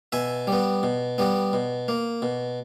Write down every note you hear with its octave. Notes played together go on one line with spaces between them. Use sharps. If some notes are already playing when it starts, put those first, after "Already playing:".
B2 E5 G#5
G3 B3
B2
G3 B3
B2
A#3
B2